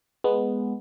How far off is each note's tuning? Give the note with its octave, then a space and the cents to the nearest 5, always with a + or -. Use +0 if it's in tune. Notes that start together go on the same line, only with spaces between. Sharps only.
G#3 +0 B3 +0